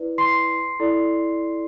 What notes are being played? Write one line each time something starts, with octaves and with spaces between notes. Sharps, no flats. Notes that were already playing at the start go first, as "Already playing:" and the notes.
Already playing: E4 B4 D5
C6 C7
E4 A4 D5